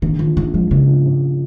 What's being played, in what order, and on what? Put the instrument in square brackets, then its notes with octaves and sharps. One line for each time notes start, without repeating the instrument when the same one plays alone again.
[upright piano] A#1 [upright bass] D#3
[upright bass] D#3 [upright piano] F3
[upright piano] A#1 [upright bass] D#3
[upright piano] G#2 [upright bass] F3
[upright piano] A#1 [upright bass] C#3
[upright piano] F3
A#1